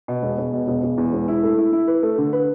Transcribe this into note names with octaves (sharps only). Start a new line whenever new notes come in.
B2
E1
E1
B2
E1
E1
E2
E1
E4
A3
E4
E4
B4
A3
D3
B4